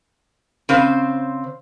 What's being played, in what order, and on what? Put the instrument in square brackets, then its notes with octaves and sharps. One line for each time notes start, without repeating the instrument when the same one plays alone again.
[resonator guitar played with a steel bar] C#3 C4 C5